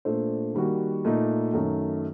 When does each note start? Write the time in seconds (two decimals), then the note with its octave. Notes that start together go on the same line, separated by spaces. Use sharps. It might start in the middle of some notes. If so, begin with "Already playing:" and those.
0.05 A#2 A3 D4 A4 C5
0.54 D#3 G3 A#3 F#4
1.05 A#2 A3 D#4
1.54 F#2 D#3 A3